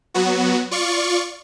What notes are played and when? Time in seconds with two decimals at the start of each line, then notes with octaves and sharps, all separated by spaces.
0.14 F#3 B3 F#4
0.71 F4 D5 C#6